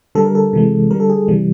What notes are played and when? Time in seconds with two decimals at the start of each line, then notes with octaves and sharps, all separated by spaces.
0.15 D3 G3 A4
0.25 A#4
0.35 A4
0.53 C3 E3 G#3
0.91 D3 G3 A#4
1.00 A4
1.10 G#4
1.28 C3 E3 G3